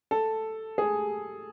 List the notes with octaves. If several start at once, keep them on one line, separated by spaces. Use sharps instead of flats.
A4
G#4